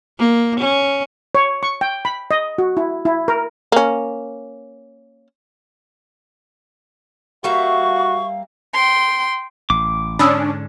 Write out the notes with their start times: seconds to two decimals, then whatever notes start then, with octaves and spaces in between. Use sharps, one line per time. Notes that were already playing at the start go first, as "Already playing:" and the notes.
0.19 A#3
0.60 C#4
1.35 C#5
1.63 C#6
1.81 G5
2.05 B5
2.31 D#5
2.58 F#4
2.77 E4
3.05 E4
3.28 A#4
3.72 A#3 C#4
7.44 G3 A#3 F#4 E5 F5 C#6
8.73 G5 C6
9.70 A1 D6
10.19 G#2 D3 C#4 D4 B5 D#6 E6